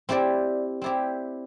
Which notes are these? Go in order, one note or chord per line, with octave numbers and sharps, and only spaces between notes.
C4 E4 G4 D5
C4 E4 G4 D5